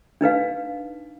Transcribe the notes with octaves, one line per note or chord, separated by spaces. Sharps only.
D4 D#4 B4 F5